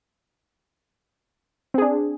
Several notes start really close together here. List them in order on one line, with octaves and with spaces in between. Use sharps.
C4 G#4 D4